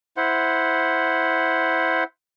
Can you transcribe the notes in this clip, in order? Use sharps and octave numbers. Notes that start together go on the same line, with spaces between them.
E4 C5 F#5